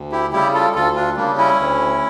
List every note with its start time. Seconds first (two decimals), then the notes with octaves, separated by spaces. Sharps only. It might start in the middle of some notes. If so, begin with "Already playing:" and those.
Already playing: D2
0.12 E4 G4
0.33 C#3 G3 E4 G4
0.54 F4 A4
0.75 D2 F4 A4
0.95 D4 F4
1.17 C#3 G3 A#3 D4
1.38 C#4 E4
1.59 D2